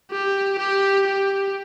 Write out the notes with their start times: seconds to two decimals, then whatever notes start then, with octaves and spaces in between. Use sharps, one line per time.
0.11 G4
0.59 G4
1.07 G4